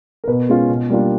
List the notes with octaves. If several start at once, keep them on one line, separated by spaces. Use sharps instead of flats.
A#4
B2 B4
G#3 C#4 F4
B2
G3 A#3 D4 F4